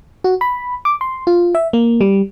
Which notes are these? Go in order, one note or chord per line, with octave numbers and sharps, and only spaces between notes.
F#4
B5
D6
C6
F4
E5
A#3
G3